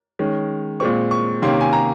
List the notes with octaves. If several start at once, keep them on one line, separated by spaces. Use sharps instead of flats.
D#3 G#3 C#4
A#2 G#3 C4 C#6
C#6
C3 D#3 A#3 C#4 C6
G#5
A#5